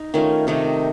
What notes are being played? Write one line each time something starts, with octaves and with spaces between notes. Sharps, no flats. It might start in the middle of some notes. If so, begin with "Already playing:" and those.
Already playing: D#4
D#3 A3 C#4 F4
C3 D#3 A3 D#4